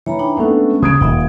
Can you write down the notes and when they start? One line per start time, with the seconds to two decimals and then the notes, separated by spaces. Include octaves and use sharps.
0.06 E3 C#5 A#5 B5
0.19 D4 D#4 G5
0.37 G#3 A3 B3 C#4 D4
0.83 C#3 D#6 G#6 D7
1.01 D#1 D#4 D#5 E5